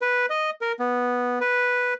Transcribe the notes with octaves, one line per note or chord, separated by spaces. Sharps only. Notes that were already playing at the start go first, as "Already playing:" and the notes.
B4
D#5
A#4
B3
B4